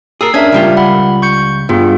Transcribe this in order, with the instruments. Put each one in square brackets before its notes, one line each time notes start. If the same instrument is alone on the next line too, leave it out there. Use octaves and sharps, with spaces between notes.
[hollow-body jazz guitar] G#4 A#4 [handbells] D#6 E6 C7
[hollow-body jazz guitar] C#4 D4 [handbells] A#4 E5 G#6
[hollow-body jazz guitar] C#2 G3 F4
[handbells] F#5 B5
C#6 G6 C#7
[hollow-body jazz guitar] G2 [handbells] B3 F4 G#4